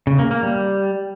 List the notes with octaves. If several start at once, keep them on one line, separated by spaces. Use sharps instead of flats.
C#3
A#3
A#3
G3